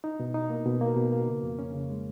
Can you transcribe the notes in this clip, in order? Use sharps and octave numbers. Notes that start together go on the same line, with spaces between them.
D#4
B2
D#4
A#3
B2
A#3
B2
A#3
C#3
F2
C#4
C#3
G#3